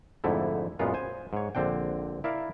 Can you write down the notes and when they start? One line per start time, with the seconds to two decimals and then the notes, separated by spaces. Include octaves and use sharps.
0.24 F2 G#2 D3 A3 E4
0.79 F#2 A#2 G#3 B3 F4
0.94 C5 G#5
1.33 G#2 C#5
1.55 A#1 D3 C4 D4 G5
2.24 E4 A#4 D5 E5 F5